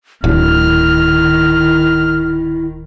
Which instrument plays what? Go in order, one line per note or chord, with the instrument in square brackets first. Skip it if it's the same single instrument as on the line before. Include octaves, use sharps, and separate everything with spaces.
[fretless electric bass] D1 [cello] D#3 [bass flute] E4 [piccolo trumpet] F6